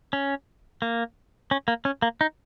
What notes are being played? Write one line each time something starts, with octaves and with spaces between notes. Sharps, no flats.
C#4
A#3
C#4
A#3
C#4
A#3
D#4